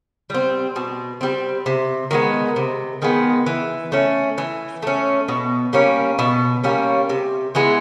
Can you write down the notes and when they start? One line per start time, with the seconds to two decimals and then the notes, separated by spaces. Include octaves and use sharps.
0.30 G3 C4
0.76 B2
1.21 G3 C4
1.66 C3
2.11 D#3 G#3 B3
2.56 C3
3.02 D#3 G#3 B3
3.46 E3
3.92 A3 C#4
4.38 E3
4.83 A3 C#4
5.28 B2
5.73 G3 A#3 C#4
6.19 B2
6.64 G3 A#3 C#4
7.09 C3
7.55 E3 G#3 B3